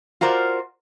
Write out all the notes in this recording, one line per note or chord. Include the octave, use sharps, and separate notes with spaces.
F4 F#4 A#4 C5 D5